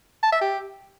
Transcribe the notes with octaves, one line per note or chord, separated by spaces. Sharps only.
A5
E5
G4